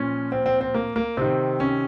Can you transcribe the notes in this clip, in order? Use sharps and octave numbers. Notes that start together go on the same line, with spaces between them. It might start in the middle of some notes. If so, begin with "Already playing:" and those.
Already playing: A#2 F3 C#4
C4
C4
C4
A#3
A#3
C3 D#3 C4
C#4